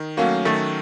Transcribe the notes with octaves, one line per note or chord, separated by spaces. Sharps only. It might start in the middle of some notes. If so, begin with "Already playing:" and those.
Already playing: D#3
F#3 A3 A#3 C#4 F#4
D#3 A3